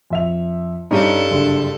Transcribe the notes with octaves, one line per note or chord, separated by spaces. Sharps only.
F2 E5 F7
G2 G3 C#4 D#4 A4
F#1 D3